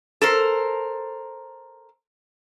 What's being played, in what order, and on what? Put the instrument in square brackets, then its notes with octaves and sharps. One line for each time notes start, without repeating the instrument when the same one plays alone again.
[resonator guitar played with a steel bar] A4 A#4 C5